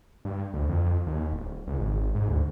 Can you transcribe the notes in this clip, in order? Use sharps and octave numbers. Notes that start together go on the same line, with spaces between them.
G2
D2
F2
D#2
D1
C#2
G#1
G#2
D2